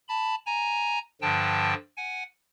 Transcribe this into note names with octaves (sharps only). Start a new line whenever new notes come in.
A5 B5
G#5 A#5
G2 D3 F3 G5 A5
F#5 G#5